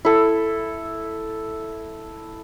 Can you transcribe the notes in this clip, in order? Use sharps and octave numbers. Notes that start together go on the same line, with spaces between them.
E4 A4